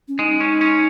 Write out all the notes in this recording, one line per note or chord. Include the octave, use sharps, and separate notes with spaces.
C#4
G#3 D#4
C#4
C#4